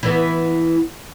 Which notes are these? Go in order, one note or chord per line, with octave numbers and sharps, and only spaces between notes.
E3 B3